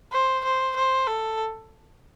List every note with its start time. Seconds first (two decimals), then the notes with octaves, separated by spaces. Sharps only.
0.12 C5
0.44 C5
0.76 C5
1.07 A4